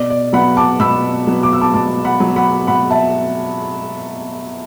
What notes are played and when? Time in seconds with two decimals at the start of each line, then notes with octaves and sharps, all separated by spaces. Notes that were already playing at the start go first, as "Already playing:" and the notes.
Already playing: B2 D5
0.10 D5
0.33 F#3 B3 F#5 B5
0.57 A5 D6
0.80 B2 B5 E6
1.27 F#3 B3
1.43 D6
1.53 E6
1.61 A5 D6
1.74 B2 A5 D6
2.05 F#5 B5
2.20 F#3 B3
2.36 F#5 B5
2.67 B2 F#5 B5
2.90 E5 A5